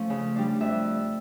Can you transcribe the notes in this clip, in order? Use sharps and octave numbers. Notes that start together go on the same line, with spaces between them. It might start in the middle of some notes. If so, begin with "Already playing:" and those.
Already playing: F3 A3 C#4 F5
C#3
G3 D4
F2 E5